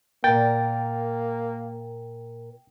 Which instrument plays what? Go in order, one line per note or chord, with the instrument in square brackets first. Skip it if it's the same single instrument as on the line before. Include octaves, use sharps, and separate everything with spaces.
[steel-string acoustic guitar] A#2 A#4 [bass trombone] A#3 [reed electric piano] G5 A6